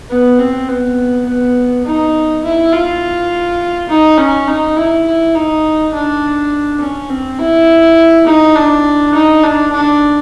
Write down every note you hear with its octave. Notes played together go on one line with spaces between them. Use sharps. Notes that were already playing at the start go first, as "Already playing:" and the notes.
B3
C4
B3
B3
D#4
E4
F4
D#4
C#4
D#4
E4
E4
D#4
D4
C#4
C4
E4
D#4
D4
D#4
D4
D4